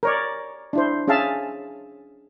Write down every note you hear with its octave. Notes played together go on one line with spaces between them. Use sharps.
A#4 C#5 D5
D4 E4 C5
C#4 G#4 E5 F5 A5